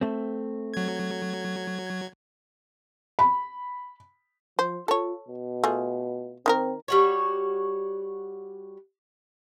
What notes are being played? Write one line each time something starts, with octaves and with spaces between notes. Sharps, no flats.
A3 C4
F#3 G#6
B5
F3 C5
F4 A4 C#5
B2
A3 F4 G#4
D#3 C4 F4 A#4
G3 F#4 C#5